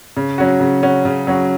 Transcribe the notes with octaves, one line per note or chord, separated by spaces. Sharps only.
C#3
F#3 C#4 F#4
C#3
F#3 C#4 F#4
C#3
F#3 C#4 F#4